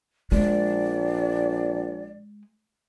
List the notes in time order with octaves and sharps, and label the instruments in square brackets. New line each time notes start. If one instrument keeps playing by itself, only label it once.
[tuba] A#1 [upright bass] G#3 [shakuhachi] D5